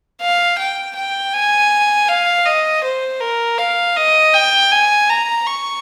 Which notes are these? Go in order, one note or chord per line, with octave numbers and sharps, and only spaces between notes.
F5
G5
G5
G#5
F5
D#5
C5
A#4
F5
D#5
G5
G#5
A#5
C#6